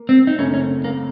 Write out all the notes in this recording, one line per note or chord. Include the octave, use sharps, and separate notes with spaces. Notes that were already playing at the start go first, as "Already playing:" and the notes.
Already playing: A#3
C4
D#4
F#2 C#3 A3 C4 C#4
C#4
A#3